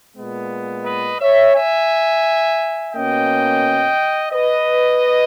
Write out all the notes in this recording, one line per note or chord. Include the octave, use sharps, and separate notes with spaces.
A#2 G#3 B3
B4 D#5
C#5 E5
E5 G#5
B2 A#3 C#4 D#5 G5
B4 D#5